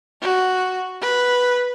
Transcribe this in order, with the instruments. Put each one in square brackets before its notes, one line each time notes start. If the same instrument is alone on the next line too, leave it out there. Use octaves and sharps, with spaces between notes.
[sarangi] F#4
B4